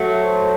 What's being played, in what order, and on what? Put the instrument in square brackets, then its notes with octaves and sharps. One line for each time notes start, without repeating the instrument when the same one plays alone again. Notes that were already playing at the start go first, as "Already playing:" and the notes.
Already playing: [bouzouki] F#3 A3
[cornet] C5